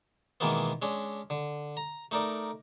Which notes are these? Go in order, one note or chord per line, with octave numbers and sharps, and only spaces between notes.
B2 D#3 E3 G#3 A#3 B3
G#3 C#4 D4
D3
A#5
A3 D#4 A#4 D5